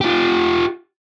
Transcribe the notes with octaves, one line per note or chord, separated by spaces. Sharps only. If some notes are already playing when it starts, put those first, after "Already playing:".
F4 G4